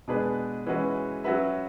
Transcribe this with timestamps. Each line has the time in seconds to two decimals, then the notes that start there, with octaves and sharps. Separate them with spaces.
0.08 B2 G#3 D4 G#4 B4
0.66 E3 G#3 C#4 F#4 B4
1.24 F#3 C#4 F#4 B4 E5